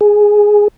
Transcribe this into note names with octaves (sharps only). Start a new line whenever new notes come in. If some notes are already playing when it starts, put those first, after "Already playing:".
G#4